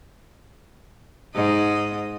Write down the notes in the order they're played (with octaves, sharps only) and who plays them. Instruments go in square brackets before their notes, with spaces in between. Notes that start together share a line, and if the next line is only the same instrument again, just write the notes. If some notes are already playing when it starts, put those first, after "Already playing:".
[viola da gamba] G#2 D#5